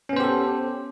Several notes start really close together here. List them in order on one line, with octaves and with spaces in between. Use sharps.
C#4 B3 C5 G4 A4